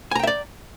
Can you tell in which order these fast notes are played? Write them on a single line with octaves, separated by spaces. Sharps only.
G#5 A#5 G5 E5 D5